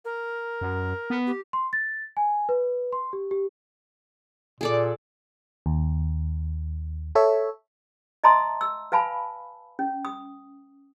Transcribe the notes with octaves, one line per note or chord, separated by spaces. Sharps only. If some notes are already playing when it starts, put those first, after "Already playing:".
A#4
F#2
B3
G4
C6
A6
G#5
B4
C6
G4
G4
A#2 G#4 A4 D5
D#2
A4 C#5 E5
D#5 E5 A5 A#5 C6 D#6
E6
B4 F5 G#5 A5 B5
C#4
D#6